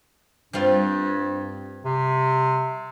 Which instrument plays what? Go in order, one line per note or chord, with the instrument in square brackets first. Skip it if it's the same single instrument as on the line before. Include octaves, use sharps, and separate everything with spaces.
[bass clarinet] G2 [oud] G3 C4 F4
[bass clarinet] C3